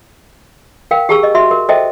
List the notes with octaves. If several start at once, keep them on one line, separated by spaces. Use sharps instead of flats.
A#4 F5 G5
G4 G#4 A5 C#6 E6
D#5
F#4 E5 C6
A#4
A4 C5 D#5 E5 G5 A5